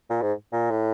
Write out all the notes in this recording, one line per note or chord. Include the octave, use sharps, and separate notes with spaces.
A#2
G#2
A#2
A2